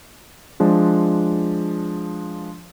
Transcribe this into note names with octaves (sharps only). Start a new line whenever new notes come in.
F3 G#3 D4